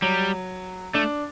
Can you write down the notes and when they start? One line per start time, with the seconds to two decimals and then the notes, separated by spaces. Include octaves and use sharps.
0.02 F#3 G3
0.94 A3 D4